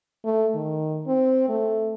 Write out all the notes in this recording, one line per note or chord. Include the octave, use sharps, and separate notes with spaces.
A3
D#3
C4
A3